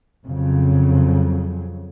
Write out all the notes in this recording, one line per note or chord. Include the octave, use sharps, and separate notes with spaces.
F2 C#3 F#3